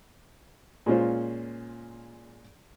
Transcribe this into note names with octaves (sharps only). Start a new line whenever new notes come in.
A#2 G#3 C#4 F4 C5